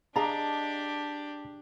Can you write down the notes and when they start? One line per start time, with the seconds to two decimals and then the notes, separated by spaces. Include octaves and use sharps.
0.16 D4 G4 G#4 D#5 F5 A5 A#5